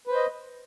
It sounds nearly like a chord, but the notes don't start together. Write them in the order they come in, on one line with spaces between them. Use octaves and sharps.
B4 C5 D#5